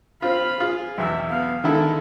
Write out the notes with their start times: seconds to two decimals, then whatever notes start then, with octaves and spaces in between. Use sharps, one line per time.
0.22 C4 F4 F5 B5
0.60 F4 G#4
0.98 B1 E2 E5 E6
1.30 B3 F5
1.64 D3 D#3 G#3 E4 A4